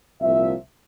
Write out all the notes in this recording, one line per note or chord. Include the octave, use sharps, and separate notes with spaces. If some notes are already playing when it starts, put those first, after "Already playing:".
C2 A#2 F3 E5